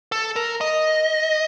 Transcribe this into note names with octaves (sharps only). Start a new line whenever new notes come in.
A4
A#4
D#5